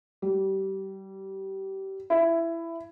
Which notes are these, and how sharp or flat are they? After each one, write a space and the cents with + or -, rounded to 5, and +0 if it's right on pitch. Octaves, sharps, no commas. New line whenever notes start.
G3 -25
E4 +15